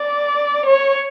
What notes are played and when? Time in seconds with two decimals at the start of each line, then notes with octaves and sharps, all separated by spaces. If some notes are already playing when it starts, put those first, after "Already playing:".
Already playing: D5
0.66 C#5